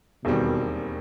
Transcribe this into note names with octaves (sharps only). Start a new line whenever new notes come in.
E1 D#2 B2 D#3 G3 C4